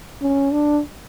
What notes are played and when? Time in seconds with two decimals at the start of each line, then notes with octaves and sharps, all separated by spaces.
0.21 C#4
0.52 D4